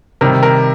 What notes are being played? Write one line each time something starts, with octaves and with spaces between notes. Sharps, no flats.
C3 D#3 G3 A#4
A#4